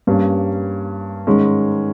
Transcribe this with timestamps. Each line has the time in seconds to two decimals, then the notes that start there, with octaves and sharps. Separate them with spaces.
0.07 G2 G3 A#3 C#4
1.27 G#2 D#3 G#3 C#4